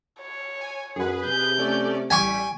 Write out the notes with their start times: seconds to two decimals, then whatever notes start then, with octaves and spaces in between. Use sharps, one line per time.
0.21 C#5
0.61 G#5
0.96 F#2 G#4 B4
1.26 C3 G6
1.58 A3 C#4 D5
2.10 A1 G3 G5 G#5 C#6 B6